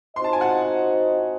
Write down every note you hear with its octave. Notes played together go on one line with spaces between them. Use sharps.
C4 D#4 F#4 C5 D#5 C6
A5
G#5
F#5 A5